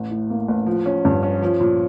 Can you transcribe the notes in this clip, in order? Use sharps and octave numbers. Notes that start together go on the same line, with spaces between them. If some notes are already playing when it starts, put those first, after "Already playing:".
Already playing: A1
A2
A#3
A1
F3
C#4
G2
C#4
F3
A#2